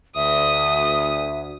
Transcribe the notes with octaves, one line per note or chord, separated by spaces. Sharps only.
D2 E5 D#6